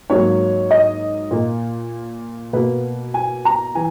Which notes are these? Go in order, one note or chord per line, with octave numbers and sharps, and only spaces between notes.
G#2 F#3 A#3 C#5
D#5
A#2 A#3
B2 A#3 B4
G#5
A#5
E3 G#5